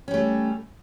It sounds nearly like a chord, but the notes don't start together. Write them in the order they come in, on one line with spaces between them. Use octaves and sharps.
C#4 G3 A3